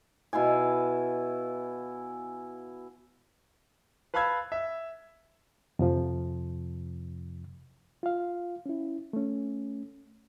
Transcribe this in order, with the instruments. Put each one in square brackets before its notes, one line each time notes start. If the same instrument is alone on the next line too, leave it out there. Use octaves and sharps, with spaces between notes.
[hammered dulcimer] B2 E4 F5 G#5
[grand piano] B4 F5 A5 B5 E6 G#6
E5
[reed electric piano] F2 C3 F3
F4 F5
C#4 E4
A3 C#4